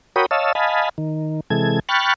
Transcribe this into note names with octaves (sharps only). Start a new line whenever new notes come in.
F#4 A#4 C#5 G5 B5 D#6
C#5 D#5 F5 A5 E6
D#5 F5 G#5 A5 B5
D#3
C3 E3 G#3 A4 G#6
G5 B5 C#6 F6 F#6 A6